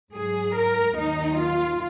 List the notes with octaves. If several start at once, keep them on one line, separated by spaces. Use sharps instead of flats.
G#2 F#3 G#4
A#4
D#2 D#3 F#3 D#4
F4